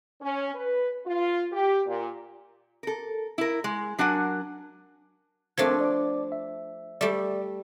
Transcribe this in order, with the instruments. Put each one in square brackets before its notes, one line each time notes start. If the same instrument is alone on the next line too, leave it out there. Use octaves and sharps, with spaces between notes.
[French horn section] C#4
B4
F4
G4
A#2
[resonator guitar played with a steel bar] A4 A#4
E4 A#4
G#3
F#3 D4 A#4 F#5 G#5
[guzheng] F3 A3 D4 [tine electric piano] C4 A#4 G#6
[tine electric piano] D5 D6
E5
[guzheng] G3 A3 [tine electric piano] D5